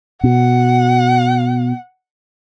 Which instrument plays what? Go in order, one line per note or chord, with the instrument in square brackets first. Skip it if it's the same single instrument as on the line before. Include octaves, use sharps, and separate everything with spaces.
[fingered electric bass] B2 [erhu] F#5